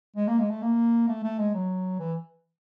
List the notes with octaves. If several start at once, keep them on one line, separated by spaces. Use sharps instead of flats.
G#3
A#3
G#3
A3
A#3
A3
A3
G#3
F#3
E3